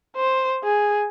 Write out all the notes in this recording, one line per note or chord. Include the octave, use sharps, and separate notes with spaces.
C5
G#4